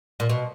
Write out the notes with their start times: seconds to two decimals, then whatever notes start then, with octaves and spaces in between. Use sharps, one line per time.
0.20 A#2
0.29 B2